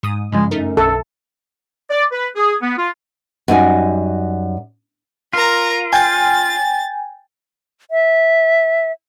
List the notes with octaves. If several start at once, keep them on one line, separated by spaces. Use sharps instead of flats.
G#2 D#6
G2 C#3 F3 G#3
F#2 A3 D#4 A#4
B1 A4
D5
B4
G#4
B3
F4
F#2 G3 D#4 G#5
F4 A#4 A#5
G5 G#5 A6
E5